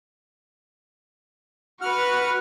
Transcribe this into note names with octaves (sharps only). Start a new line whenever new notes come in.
F#4 B4 F#5 F6